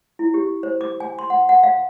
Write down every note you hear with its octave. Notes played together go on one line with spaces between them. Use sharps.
E4
G4
C5
D6
G#5
C6
F#5
F#5
F5